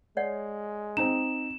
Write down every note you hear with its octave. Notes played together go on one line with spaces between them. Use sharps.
G#3 C#5 D5 F#5
C4 D#4 E7